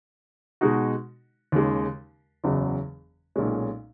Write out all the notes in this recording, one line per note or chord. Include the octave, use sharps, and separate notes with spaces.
B2 G#3 D#4 F#4
D#2 C#3 G#3
F#1 E2 C#3 F#3
B1 A#2 G#3 C#4